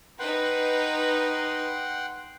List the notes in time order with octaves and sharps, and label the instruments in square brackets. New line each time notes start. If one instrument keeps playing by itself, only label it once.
[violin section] D#4 B4 [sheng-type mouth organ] F#5 G5 C6